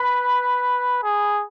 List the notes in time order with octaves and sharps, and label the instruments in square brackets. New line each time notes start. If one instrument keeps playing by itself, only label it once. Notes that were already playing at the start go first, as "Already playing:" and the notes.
Already playing: [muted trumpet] B4 [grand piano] B5
[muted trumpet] G#4